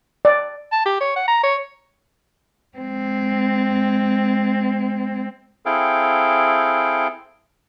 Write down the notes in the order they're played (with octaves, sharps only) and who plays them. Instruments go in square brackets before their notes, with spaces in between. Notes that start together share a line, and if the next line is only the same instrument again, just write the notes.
[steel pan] D5
[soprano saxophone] A5
G4
C#5
F#5
A#5
C#5
[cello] G#3 C4
[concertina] C4 E4 G#4 A4 F5 G5